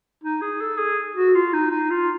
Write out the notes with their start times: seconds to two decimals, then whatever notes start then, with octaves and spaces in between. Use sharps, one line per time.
0.24 D#4
0.42 G#4
0.61 A4
0.78 G#4
1.16 F#4
1.35 F4
1.53 D#4
1.71 D#4
1.90 F4